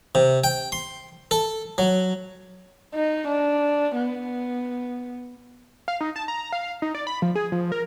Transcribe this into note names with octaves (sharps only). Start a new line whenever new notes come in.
C3
G5
C6
A4
F#3
D#4
D4
B3
F5
D#4
A5
A#5
F5
D#4
D5
B5
F3
G#4
F3
A#4